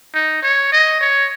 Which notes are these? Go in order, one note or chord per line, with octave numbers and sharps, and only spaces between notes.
D#4
C#5
D#5
C#5